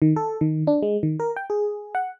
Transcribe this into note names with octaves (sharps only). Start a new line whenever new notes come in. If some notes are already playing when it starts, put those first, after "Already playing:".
D#3
A4
D#3
D4
G#3
D#3
A#4
G5
G#4
F#5